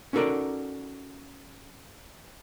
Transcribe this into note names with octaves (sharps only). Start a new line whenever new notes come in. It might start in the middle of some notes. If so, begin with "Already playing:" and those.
C#4 D#4 F#4 A4 A#4 D5